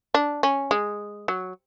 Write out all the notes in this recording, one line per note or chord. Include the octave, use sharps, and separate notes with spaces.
D4
C#4
G#3
F#3